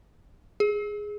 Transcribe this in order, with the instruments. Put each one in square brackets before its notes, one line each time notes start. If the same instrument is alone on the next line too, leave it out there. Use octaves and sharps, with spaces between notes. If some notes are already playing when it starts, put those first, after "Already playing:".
[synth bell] G#4